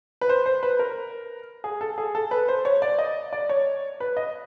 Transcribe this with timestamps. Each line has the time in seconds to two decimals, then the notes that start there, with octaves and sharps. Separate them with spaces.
0.21 B4
0.29 C5
0.46 C5
0.63 B4
0.79 A#4
1.64 G#4
1.81 A4
1.98 G#4
2.15 A4
2.31 B4
2.48 C5
2.65 C#5
2.82 D5
2.99 D#5
3.33 D5
3.49 C#5
4.00 B4
4.17 D#5